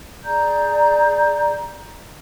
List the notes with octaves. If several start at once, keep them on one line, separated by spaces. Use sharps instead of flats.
G#4 D5 A#5 G6